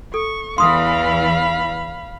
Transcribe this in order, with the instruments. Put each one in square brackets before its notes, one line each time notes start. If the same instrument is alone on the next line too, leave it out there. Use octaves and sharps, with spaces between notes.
[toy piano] A4 [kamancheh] C#6
[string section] E2 E3 [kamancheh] F5 B5 [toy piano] C6 D#6